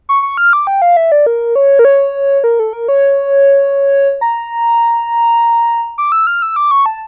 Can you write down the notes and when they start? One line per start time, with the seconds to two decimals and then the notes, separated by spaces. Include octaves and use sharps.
0.09 C#6
0.23 C#6
0.37 F6
0.53 D6
0.67 G5
0.82 F5
0.97 E5
1.12 D5
1.26 A#4
1.55 C#5
1.79 A#4
1.85 C#5
2.44 A#4
2.60 A4
2.73 A#4
2.88 C#5
4.21 A#5
5.98 D6
6.12 E6
6.27 F6
6.42 E6
6.56 D6
6.71 C#6
6.86 A5